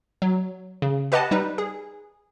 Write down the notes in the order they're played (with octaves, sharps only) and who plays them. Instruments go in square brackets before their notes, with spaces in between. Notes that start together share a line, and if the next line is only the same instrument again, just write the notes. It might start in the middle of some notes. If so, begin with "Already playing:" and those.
[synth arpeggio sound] F#3
C#3
G4 B4 D#5 F#5 A5
G3 D#4 B4
G#4